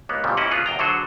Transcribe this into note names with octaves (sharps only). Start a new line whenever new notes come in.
C#2 A#3 B3
F2 A#2 C#3 E3 G3
E3 C#4 E4 D#5 F#5
A3 B3 C4 F4 G#4 B4
E2 G5 A#5
D3 F#3 F#4 G#4 A4 C5